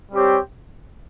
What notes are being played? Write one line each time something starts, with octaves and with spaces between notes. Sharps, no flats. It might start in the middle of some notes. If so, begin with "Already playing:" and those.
G3 C4 G4 C#5